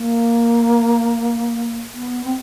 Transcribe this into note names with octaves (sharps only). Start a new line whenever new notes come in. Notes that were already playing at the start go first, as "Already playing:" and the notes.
Already playing: A#3
B3
C4